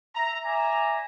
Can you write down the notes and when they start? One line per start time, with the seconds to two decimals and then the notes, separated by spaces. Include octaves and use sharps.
0.15 E5 A#5
0.45 D5 E5 G#5 A#5